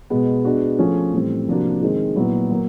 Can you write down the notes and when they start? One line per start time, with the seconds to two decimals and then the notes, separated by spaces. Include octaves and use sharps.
0.10 B2 G#3 B3
0.45 G#3 B3 D4 F#4
0.79 F3 A3 C#4 F4 G#4
1.13 A2 E3 G3 C4
1.47 C3 F3 A#3 D4 F#4
1.83 D#3 G#3 C4
2.16 A#2 F#3 B3 E4
2.51 F#3 A#3